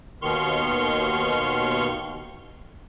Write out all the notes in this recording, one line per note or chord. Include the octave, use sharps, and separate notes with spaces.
D#2 B2 D#3 C6 C#6 F6